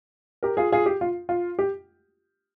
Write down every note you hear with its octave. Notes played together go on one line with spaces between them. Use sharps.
G4 A#4
F4 G#4
F4 G#4
G4
F4
F4
G4